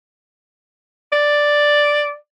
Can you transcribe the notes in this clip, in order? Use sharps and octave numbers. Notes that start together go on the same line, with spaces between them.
D5